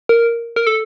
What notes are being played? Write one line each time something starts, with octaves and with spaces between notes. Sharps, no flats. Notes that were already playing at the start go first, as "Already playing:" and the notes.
A#4
A#4
A4